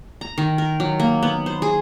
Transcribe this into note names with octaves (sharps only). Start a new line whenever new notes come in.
A#5
D#3
A#4
F#3
A#3
B3
C5
G#4